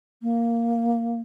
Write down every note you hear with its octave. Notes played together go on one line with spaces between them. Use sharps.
A#3